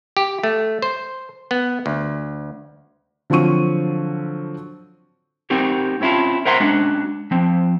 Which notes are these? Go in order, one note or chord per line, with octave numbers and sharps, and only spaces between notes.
G4
A3
C5
B3
D2
D3 F3 F#3 C4 C#6 D#7
C4 D#4 F#4 G4 A#4
C4 C#4 E4 F4 A5
A#4 C5 E5 F#5 A#5 C6
G#3 C#4 D4 F#4
F3 C4